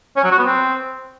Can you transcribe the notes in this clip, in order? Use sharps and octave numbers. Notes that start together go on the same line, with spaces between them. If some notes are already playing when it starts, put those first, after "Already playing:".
C#4
F#3
F#4
B3
C4